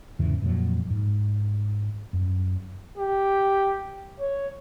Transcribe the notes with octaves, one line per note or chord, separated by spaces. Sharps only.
E2 G#2 C#3 E3
F2 A#2 F#3
G#2
F#2
G4
C#5